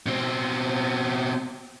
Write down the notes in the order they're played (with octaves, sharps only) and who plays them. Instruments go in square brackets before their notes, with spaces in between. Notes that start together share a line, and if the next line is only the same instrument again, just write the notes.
[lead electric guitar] B2 C4